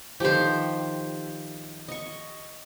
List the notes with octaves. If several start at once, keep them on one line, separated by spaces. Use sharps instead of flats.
D#3 F3 G4 C5
D#5 C#6